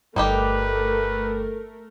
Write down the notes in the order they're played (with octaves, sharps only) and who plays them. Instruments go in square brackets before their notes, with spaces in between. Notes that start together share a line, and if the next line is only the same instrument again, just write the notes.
[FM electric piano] G1 G2 [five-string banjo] G3 D#4 G4 [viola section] A3 A#4 [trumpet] B4